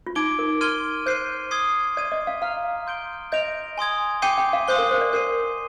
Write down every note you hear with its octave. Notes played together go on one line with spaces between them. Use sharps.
F4
D#4 D6 G#6 D7 G7
A#4
C6 F6 G#6 D#7 G7
C5 G6 C7 D#7
D#6 G#6 C7 G7
D5 D#6 G#6 D#7 G7
D#5
F5
F5 A#5 F6 C7 F7
C6 G6 D7 G7
D#5 G6 A#6 D7 F7
G#5 C6 D#6 G#6
G5 D6 G6 C7 D#7 G7
G5
F5
C5 C6 D#6 G6 C7 G7
A#4
C5
D5
A#4 G6 C7 D#7